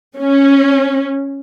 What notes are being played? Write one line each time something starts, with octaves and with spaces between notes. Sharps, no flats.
C#4